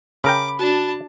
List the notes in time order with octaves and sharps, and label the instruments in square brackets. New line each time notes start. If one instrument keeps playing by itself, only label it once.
[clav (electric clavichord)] C#3 A#4 G5 [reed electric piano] B5 [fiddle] D6
[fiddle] D4 A5 [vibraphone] F#4